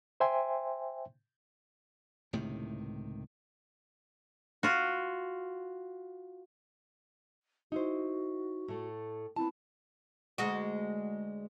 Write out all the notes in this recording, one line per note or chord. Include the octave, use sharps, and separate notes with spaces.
C5 E5 G5 G#5 C6
C#2 A2 C3 D#3
F4 F#4
D#4 E4 F#4 C5
A2 A3
B3 C4 E4 A5
D2 G#3 F#4